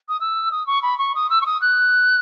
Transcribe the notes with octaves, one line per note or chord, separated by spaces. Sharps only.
D#6
E6
D#6
C#6
B5
C#6
D#6
E6
C#6
D#6
F#6